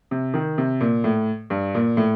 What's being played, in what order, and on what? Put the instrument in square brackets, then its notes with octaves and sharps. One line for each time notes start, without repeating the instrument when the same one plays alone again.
[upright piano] C3
D#3
C3
A#2
A2
G2
A#2
A2